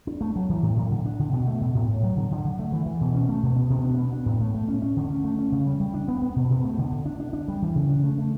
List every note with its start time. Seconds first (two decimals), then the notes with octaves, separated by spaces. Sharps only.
0.07 D4
0.21 A3
0.36 F#3
0.49 E3
0.63 A2
0.77 A2
0.91 D3
1.05 D4
1.19 D3
1.33 B2
1.47 A3
1.61 B2
1.75 A2
1.89 A2
2.03 F#3
2.16 D3
2.31 D3
2.44 D3
2.59 A3
2.72 E3
2.86 E3
3.01 B2
3.14 C#4
3.29 A3
3.43 B2
3.56 B3
3.70 B2
3.84 D4
3.98 B3
4.13 D4
4.26 A2
4.41 A3
4.54 A3
4.68 C#4
4.82 C#4
4.97 D3
5.11 C#4
5.24 A3
5.39 C#4
5.52 C#3
5.66 G3
5.80 G3
5.94 D4
6.08 B3
6.22 B3
6.36 B2
6.50 B2
6.64 A3
6.78 D3
6.92 D3
7.06 D4
7.20 D4
7.33 D4
7.48 G3
7.62 E3
7.75 C#3
7.90 D4
8.04 A3
8.18 A3